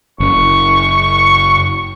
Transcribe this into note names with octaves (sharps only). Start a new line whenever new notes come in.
F#1 C#6